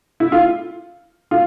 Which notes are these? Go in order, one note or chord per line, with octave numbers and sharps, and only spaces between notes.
E4
F4
F4